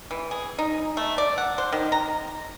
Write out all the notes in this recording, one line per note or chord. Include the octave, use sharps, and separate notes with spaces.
E3
G#4
D#4
A3
D5
F#5
C5
D#3
A#5